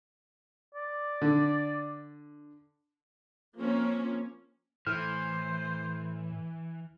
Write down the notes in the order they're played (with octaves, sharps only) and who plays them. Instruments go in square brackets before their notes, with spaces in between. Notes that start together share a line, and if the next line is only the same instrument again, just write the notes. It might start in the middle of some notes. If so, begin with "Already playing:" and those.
[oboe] D5
[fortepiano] D3
[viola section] F3 A#3 C4 C#4
[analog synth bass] A2 [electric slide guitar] E3 [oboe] C5 [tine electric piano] F6